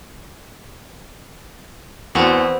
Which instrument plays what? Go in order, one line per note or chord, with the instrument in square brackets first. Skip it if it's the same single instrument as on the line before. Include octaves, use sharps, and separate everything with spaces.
[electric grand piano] E2 [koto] B3 C4 F#4